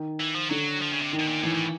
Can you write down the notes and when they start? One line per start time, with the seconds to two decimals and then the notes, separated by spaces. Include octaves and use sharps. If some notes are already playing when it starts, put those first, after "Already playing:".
Already playing: D#3
0.20 E3
0.35 F3
0.50 D3 F#3
0.82 F3
0.93 C#3
1.02 C3
1.13 D#3
1.20 B2
1.28 A#2
1.43 A2 E3
1.54 A2